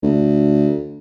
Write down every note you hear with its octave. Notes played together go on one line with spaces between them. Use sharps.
D2